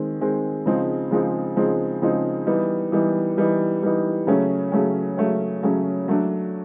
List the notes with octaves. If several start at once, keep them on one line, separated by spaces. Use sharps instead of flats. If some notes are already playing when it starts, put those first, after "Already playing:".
Already playing: D#3 G#3 C4
D#3 G#3 C4
C#3 F3 G#3 C4 D#4
C#3 F3 G#3 C4 D#4
C#3 F3 G#3 C4 D#4
C#3 F3 G#3 C4 D#4
E3 G3 B3 D#4
E3 G3 B3 D#4
E3 G3 B3 D#4
E3 G3 B3 D#4
C#3 F#3 A3 C#4
C#3 F#3 A3 C#4
C#3 F#3 A3 C#4
C#3 F#3 A3 C#4
F#3 A3 D4